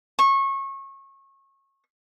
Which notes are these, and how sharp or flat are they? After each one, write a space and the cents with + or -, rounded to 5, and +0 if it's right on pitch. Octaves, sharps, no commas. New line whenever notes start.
C#6 -25